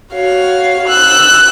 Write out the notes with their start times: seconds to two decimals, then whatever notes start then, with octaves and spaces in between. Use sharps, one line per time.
0.13 F#4 C#5 F5
0.88 E6 F#6